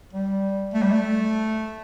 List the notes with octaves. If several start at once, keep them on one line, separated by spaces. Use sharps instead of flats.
G3
A3
G3
A3